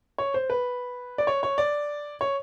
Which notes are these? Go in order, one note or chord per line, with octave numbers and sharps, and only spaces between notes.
C#5
C5
B4
D5
C#5
C#5
D5
C#5